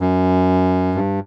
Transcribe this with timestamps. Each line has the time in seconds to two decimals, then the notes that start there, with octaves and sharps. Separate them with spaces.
0.01 F#2
0.95 G2